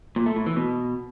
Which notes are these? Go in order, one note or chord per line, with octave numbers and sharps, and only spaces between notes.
A#2
A3
A2
E3
B2